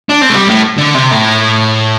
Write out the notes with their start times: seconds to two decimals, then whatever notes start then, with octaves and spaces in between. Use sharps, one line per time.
0.09 D4
0.22 C4
0.30 A3
0.35 G3
0.47 A2
0.77 D3
0.94 C3
1.11 A2